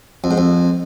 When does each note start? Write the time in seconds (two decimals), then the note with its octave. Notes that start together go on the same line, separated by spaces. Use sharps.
0.24 F2
0.31 G#2
0.38 F2